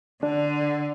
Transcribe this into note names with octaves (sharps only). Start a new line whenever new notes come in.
D3 D4